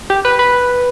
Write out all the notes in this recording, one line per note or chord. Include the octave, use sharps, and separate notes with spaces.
G4
B4
B4